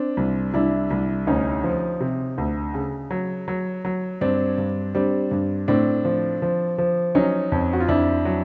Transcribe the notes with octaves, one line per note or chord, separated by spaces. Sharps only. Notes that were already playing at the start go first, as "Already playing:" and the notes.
Already playing: C4 D4
C2
C2 D4 E4
C2
D2 C#4 D#4
F3
C3
D2
C#3
F#3
F#3
F#3
G2 C4 D4
G2
G3 C4 D4
G2
A2 C4 D4
F3
F3
F3
F#3 C#4 D#4
F2
F#4
F4
F2 D4 E4
F#3